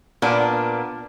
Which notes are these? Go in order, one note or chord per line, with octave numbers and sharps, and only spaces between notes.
A#2 A#3 B3 D4